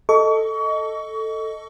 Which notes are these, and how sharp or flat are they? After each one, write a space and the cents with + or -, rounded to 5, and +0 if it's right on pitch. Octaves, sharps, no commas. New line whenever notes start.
A4 +10 D#5 +5 C#6 +35